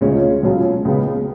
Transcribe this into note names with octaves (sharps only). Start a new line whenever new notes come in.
D2 C#3 G#3 C#4 F4
C#2 B2 F#3 C#4 F4
C#2 C#3 G#3 B3